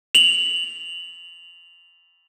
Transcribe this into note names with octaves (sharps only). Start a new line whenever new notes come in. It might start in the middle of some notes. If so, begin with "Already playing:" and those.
F7 F#7